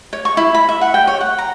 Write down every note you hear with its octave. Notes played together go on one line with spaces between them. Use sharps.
C#5
C#6
E4
B5
E5
F#5
G5
C#5
F#5
A#5